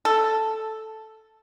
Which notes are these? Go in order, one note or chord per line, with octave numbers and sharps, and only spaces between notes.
A4